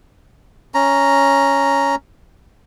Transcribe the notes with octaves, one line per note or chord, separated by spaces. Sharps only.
C#4 A#5